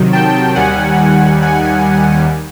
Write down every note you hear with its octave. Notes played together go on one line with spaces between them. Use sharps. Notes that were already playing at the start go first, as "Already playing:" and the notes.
Already playing: C3 D#3 F#3
G5 A5
D#2 D#3 G3 F#5 G#5
F#5 G#5